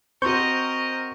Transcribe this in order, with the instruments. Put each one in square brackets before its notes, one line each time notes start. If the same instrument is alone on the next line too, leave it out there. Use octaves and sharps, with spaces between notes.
[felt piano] C4 F#4 [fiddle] A#4 D#5 [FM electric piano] C5 C#6 G6